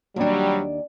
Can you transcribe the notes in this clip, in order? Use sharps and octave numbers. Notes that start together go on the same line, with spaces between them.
D#2 F#3 G3 D4